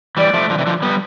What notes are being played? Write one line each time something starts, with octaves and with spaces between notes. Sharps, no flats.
E3 G3 D5
F3 A3
D3 F3
C3 E3
D3 F3
G3 B3